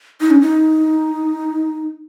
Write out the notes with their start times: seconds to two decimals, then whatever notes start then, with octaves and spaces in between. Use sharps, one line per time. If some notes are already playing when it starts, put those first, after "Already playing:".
0.21 D#4
0.31 C#4
0.41 D#4